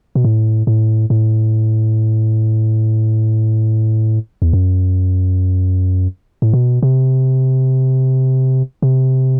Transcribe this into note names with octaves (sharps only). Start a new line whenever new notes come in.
B2
A2
A2
A2
E2
F#2
A2
B2
C3
C3